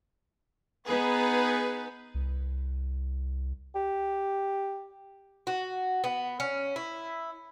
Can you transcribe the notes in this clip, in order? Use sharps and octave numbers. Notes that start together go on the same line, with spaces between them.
B3 D#4 G#4 B4
C2
G4
F#4
B3
C#4
E4